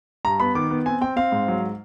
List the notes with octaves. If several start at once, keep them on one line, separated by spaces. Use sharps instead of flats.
G2 A#5
B3 B5
D#3 D6
B3
C4 G#5
C4 G5
C4 F5
G#2
F#3